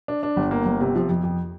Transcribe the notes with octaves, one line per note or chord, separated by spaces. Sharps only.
D4
D4
G1
A#3
G1
C3
F3
F2
F2